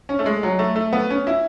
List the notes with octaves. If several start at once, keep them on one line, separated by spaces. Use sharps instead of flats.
C#4
A3
G#3
F#3
A3
A3
B3
C#4
E4